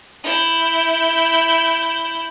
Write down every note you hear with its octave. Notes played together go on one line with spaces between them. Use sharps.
E4 G6